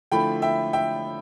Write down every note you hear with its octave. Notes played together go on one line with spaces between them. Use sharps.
D3 F3 A3 E4 G5 B5
E5 G5
E5 G5